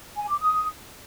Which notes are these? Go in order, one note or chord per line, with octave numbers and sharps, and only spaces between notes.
G#5
D6
D#6